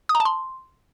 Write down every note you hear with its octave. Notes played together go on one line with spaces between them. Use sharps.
D#6
A#5
A5
C6